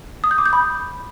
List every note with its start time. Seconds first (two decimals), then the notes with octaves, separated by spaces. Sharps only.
0.24 D#6
0.31 G6
0.38 D6
0.46 G6
0.53 B5